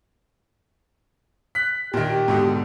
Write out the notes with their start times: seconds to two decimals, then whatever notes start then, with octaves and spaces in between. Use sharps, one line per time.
1.55 F#6 B6
1.94 A#2 D#3 G4
2.28 G#2 B2 D3